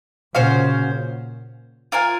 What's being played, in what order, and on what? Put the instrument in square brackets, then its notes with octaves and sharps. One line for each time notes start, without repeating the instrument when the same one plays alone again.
[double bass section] A#2 C#3 [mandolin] C#4 F#4 C5 F5
[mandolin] F4 A#4 F5 G#5